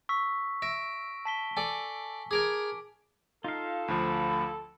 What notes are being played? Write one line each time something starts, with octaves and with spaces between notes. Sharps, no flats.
C#6 E6 B6
E5 A#6 D7
A5 B6 G7
A4 D5 G#5
G#4 A#4 G#5 D6 D7
D#4 F4 A4 F5
D2 F3 B5